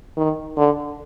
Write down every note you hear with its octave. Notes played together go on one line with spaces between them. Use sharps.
D#3
D3